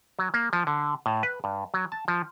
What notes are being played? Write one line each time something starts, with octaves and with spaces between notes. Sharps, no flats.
F#3
A#3
F3
D3
A2
B4
G2
F#3
A5
F3